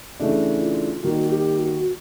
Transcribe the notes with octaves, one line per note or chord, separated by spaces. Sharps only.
C#3 E3 A3 D4
F4
D#3 G3 A#3 F#4
F#4
G4
F#4